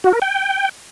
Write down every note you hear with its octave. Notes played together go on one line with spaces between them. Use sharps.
F#4
A#4
G5